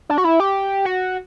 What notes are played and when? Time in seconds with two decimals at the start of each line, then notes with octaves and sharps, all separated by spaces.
0.09 D4
0.18 F#4
0.24 E4
0.40 G4
0.85 F#4